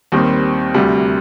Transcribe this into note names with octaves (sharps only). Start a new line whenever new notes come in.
D#2 D#3 G3 C4
D2 C3 G3